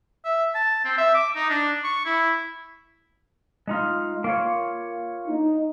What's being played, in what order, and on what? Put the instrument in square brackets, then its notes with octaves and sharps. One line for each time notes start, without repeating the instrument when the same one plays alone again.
[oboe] E5
A5
C4
E5
D6
D#4
D4
C#6
E4
[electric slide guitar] G#3 D#4 F4
A#3 F4 C#5
[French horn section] D#4